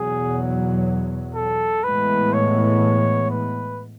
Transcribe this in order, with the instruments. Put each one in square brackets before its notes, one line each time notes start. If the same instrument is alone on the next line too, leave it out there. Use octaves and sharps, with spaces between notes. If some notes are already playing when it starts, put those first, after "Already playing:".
Already playing: [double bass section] E2 B2 F#3 [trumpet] G#4
[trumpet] A4
[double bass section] A2 E3 G#3 B3 [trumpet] B4
[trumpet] C#5
B4